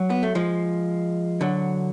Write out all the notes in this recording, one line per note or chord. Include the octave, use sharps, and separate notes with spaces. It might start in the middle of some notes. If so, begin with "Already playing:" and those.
Already playing: F#3
B3
A3
F3 G#3
D3 F#3